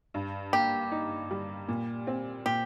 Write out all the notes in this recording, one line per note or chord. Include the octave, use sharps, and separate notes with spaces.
G2
A#3 G4
D#4
G3
A#2
C4
A#2 G4